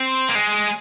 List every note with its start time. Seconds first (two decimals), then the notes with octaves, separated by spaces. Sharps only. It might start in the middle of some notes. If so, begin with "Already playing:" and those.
Already playing: C4
0.29 A#3
0.35 G#3